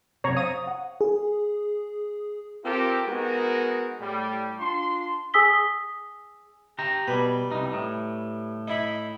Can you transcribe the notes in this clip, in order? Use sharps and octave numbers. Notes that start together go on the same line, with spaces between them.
F#2 C3 C#5 A#5
C5 C#5 F5 D#6
F#5
G#4
C4 F4 G4 A4 A#4
G#3 B3 D#4 F#4 A#4
A2 G3
D4 F4 C6
G#4 G#5 D#6 E6 B6 G7
G4 A#5
B2 G3 B4
C2 D#4
A2
D#4 E4 B5